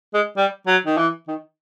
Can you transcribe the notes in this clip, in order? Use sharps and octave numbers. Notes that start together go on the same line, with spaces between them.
G#3
G3
F#3
D#3
E3
D#3